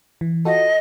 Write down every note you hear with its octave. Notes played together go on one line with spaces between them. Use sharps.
E3
F4 F#4 A4 D#5